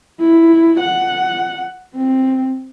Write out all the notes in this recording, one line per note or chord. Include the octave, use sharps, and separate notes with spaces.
E4
F#5
C4